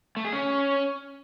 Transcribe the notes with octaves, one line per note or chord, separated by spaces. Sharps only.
A3
G#4
C#4